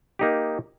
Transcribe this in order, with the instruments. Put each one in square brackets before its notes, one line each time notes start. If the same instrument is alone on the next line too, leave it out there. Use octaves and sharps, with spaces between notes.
[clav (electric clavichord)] A#3 D#4 G4